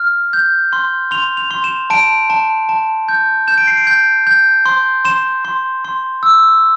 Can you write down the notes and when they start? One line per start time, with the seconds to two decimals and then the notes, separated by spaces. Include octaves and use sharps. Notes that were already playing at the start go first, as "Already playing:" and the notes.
Already playing: F6
0.33 G6
0.73 C6
1.11 C6 F7
1.37 F7
1.51 C6
1.64 E7
1.90 A5 D7
2.30 A5
2.69 A5
3.08 G6
3.48 G6 E7
3.58 D7
3.67 C7
3.77 D7
3.87 G6
4.27 G6
4.65 C6
5.05 C6 E7
5.45 C6
5.84 C6
6.23 E6